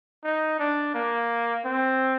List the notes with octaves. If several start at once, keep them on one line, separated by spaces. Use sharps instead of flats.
D#4
D4
A#3
C4